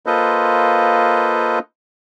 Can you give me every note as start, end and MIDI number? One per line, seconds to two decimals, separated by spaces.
0.06 1.59 58
0.06 1.59 65
0.06 1.59 69
0.06 1.59 71
0.06 1.59 72
0.06 1.59 75